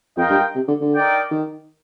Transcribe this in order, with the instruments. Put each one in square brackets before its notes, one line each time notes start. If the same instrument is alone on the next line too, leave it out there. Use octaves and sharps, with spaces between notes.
[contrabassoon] F2 [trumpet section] F4 A#4 D#5 G5
[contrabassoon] G2
C3
D3
D3
[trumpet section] D#4 A#4 D5 G5
[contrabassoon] D#3